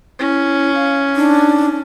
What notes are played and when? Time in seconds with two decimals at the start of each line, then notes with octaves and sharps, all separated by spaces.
0.19 C#4 E4
0.74 F5
1.16 D4 D#4